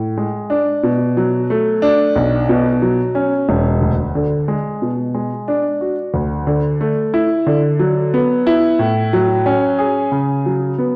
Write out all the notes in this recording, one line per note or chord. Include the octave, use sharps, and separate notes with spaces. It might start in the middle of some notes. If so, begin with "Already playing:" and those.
Already playing: A2
G#3
D4
B2
F#3
A3
D4
B1
B2
F#3
C#4
E1
D2
D3
G#3
B2
G#3
D4
F#4
D2
D3
A3
E4
D3
F#3
B3
E4
A2
F#3
C#4
G#4
C#3
F#3
B3